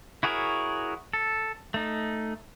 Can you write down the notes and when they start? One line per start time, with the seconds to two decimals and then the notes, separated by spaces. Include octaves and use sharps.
0.23 E4 F#4 G#4 A#4 C#5
1.13 A4
1.74 A3 D#4